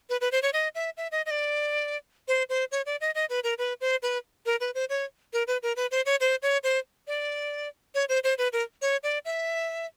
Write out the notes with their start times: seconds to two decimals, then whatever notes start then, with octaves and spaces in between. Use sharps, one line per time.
0.10 B4
0.21 B4
0.32 C5
0.42 C#5
0.53 D#5
0.75 E5
0.97 E5
1.12 D#5
1.26 D#5
1.31 D5
2.28 C5
2.49 C5
2.72 C#5
2.86 D5
3.01 D#5
3.15 D#5
3.30 B4
3.44 A#4
3.58 B4
3.81 C5
4.02 B4
4.46 A#4
4.61 B4
4.75 C5
4.89 C#5
5.33 A#4
5.47 B4
5.63 A#4
5.76 B4
5.91 C5
6.06 C#5
6.20 C5
6.42 C#5
6.64 C5
7.07 D5
7.95 C#5
8.09 C5
8.24 C5
8.38 B4
8.53 A#4
8.82 C#5
9.03 D5
9.25 E5